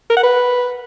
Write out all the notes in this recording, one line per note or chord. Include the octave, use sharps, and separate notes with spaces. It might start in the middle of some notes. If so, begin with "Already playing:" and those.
A#4
F#5
B4